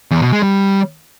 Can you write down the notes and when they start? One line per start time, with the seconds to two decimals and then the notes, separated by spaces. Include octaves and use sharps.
0.11 E2
0.22 B2
0.32 G#3
0.43 G3